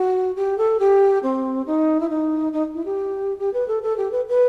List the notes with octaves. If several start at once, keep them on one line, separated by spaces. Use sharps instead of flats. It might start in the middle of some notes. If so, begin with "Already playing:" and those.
Already playing: F#4
G4
A4
G4
C4
D#4
E4
D#4
D#4
E4
G4
G4
B4
A4
A4
G4
B4
B4